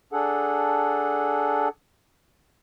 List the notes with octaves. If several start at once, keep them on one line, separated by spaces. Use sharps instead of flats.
D4 G#4 A4 F#5